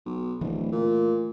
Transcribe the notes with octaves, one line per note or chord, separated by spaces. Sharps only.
B1
D1 E3 A3
A#2